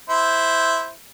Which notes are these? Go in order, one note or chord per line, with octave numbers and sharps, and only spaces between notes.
E4 C5